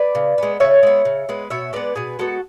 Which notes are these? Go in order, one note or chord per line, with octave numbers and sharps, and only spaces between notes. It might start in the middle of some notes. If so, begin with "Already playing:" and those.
Already playing: B4 D5
C#3
G#3 B3
C#3 C#5 E5
G#3 B3
C#3
G#3 B3
B2 C#5 E5
G#3 B3 B4 D5
B2 G#4 B4
G#3 B3 F#4 A4